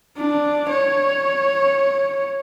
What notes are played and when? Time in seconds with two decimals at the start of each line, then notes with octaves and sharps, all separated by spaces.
0.17 D4
0.69 C#5